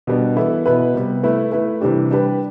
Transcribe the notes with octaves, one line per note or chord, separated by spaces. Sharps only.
B2 G3 B3 D4
E3 B3 E4 A4
B2 B3 E4 B4
C3 G3 B3
A3 E4 B4
A3 E4 B4
C3 E3 G3 D4 G4
G3 D4 G4 B4